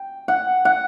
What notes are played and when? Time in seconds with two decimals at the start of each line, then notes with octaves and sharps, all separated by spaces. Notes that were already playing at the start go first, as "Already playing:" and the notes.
Already playing: G5
0.28 F#5
0.65 F#5